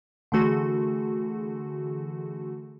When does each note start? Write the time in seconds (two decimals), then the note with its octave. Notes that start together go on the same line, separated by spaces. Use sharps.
0.32 D3 E3 A3 F#4 G#4